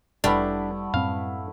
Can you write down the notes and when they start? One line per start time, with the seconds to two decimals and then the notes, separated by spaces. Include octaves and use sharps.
0.24 F1 G3 A3 B3 D4 E4
0.94 F#2 A2 C4 F5